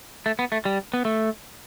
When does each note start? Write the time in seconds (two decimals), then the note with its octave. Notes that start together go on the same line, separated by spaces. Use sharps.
0.26 A3
0.39 B3
0.52 A3
0.65 G3
0.93 B3
1.05 A3